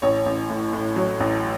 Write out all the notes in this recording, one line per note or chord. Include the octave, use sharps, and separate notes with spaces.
A1 C#5
A1
A2
A2
F#3
A1